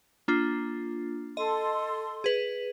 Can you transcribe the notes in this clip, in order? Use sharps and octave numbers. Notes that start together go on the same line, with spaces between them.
A#3 D4 F4
A4 D#5 C6
G#4 B4